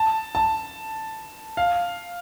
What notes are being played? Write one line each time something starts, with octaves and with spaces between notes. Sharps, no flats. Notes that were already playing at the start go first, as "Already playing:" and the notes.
Already playing: A5
A5
F5